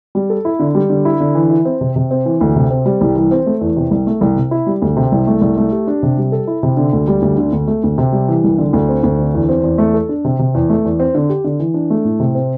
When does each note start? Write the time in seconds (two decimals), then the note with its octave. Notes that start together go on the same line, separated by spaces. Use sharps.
0.15 G3
0.30 A4
0.45 E4
0.59 D3
0.75 G3
0.90 D3
1.05 E4
1.20 D3
1.35 E3
1.50 E4
1.65 C4
1.81 C3
1.96 C3
2.11 C4
2.26 E3
2.41 D2
2.56 C3
2.70 C4
2.86 G3
3.01 C2
3.15 E3
3.31 C4
3.46 A3
3.61 E2
3.76 C3
3.91 C2
4.07 A3
4.21 C2
4.36 C3
4.51 E4
4.67 G3
4.82 D2
4.97 C3
5.12 C2
5.27 A3
5.41 C2
5.57 A3
5.72 G4
5.87 D4
6.03 C3
6.18 G3
6.32 A4
6.47 E4
6.63 C3
6.77 D3
6.93 D2
7.07 G3
7.22 D2
7.38 D3
7.52 D2
7.68 A3
7.84 D2
7.98 C3
8.13 G3
8.28 E3
8.44 C2
8.58 D3
8.73 D2
8.89 C4
9.03 D2
9.19 D3
9.34 E2
9.49 C4
9.63 E2
9.78 A3
9.94 A4
10.09 D4
10.25 C3
10.39 C3
10.54 E2
10.70 A3
10.85 E2
11.00 C4
11.15 D3
11.29 G4
11.44 D3
11.60 E3
11.74 D4
11.90 A3
12.04 A2
12.20 C3
12.35 C4